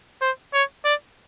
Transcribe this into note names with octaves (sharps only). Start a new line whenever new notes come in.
C5
C#5
D5